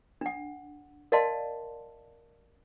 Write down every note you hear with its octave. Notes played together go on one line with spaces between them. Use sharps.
D4 F#5
A#4 D5 D#5 F5 A5 C6